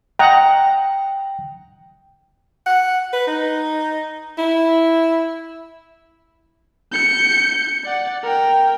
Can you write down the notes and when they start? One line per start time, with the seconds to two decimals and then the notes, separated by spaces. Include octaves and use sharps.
0.19 D#5 F#5 G5 A#5
2.66 F#5
3.13 B4
3.27 D#4
4.38 E4
6.92 G6 C#7
7.85 D5 F#5
8.23 A#4 G5